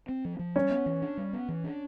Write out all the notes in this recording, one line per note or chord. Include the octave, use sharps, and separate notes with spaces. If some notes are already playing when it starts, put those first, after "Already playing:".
C4
F3
F3
G3 C#4
B3
E3
D4
G3
B3
E3
D4